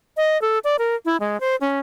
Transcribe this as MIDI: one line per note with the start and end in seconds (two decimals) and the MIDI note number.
0.17 0.40 75
0.42 0.59 69
0.64 0.76 74
0.79 0.95 70
1.05 1.17 64
1.20 1.39 56
1.40 1.56 72
1.61 1.80 61